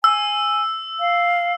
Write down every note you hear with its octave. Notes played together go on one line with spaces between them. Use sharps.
G#5 E6
F5